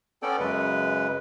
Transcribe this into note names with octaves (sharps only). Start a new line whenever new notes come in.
B3 C#4 A4 D5 G5
F#2 C#3 G#3 B4